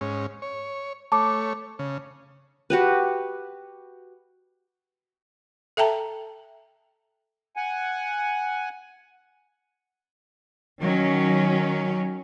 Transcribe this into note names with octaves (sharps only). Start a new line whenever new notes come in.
G#2 C#4
C#5
A3 C#5 A5 D6
C#3
F#4 G4 B4
A4 E5 G5 A5 A#5
F#5 G#5
D#3 F#3 C#4